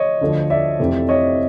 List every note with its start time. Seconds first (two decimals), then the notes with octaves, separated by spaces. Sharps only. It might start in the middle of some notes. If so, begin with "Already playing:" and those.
Already playing: C#5 D#5
0.21 D2 D3 F3
0.50 D5 E5
0.79 F1 F2 C3 E3
1.09 C#5 D#5